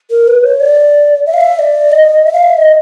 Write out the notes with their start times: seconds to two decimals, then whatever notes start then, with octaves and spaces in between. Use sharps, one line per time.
0.11 A#4
0.27 B4
0.43 C#5
0.60 D5
1.26 E5
1.34 F5
1.41 E5
1.59 D5
1.92 D#5
2.25 E5
2.33 F5
2.43 E5
2.57 D#5